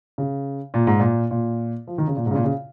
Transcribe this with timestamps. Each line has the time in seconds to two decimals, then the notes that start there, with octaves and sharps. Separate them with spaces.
0.18 C#3
0.74 A#2
0.87 G#2
1.00 A#2
1.31 A#2
1.88 F3
1.98 D#3
2.08 C#3
2.17 A#2
2.26 G#2
2.31 C#3
2.35 A#2
2.44 C#3